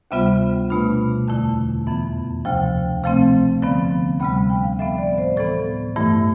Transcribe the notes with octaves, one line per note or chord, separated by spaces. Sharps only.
D2 C3 G3 B3 F4 E5
B2 A3 D4 F4 B5
E2 D3 A3 E4 A5
F2 E3 B3
D2 C3 F3 G5
C3 F3 A3 C4 F5
D3 F3 B3
D2 C3 G3 B5
G5
F5
A2 F3 B3 E5
D5
C5
A2 E3 B3 A4
G2 E3 A3 E4